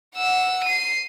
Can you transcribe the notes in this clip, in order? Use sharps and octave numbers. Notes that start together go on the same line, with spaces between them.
F#5 E6
C7 D#7